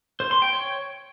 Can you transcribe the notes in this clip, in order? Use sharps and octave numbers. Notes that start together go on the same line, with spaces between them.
C5
C6
G5
C#5